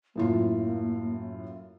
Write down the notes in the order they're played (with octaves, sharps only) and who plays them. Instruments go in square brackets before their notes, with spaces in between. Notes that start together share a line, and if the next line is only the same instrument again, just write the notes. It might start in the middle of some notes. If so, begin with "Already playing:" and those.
[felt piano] F#2 A2 F4 [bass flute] A#3